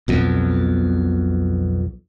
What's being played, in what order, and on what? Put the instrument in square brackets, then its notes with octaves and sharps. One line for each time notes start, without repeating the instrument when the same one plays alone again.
[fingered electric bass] B1 F2 B2